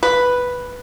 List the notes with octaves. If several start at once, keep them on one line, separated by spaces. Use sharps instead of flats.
B4